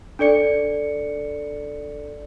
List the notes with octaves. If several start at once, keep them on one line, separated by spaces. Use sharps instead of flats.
D4 A4 D5 C#7